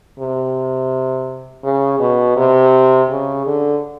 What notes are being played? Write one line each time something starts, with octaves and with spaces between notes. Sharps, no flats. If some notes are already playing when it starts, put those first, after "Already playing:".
C3
C#3
B2
C3
C#3
D3